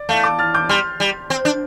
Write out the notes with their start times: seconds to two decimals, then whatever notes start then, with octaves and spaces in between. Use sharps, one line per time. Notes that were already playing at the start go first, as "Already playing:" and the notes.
Already playing: D5
0.09 A3 F5 A5
0.24 A5 D6
0.39 F6 A6
0.54 D6 G6
0.69 G3 C6 F6
1.00 G3
1.30 C4
1.45 D4